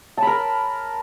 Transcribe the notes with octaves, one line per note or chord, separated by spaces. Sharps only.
A#4 A5 B5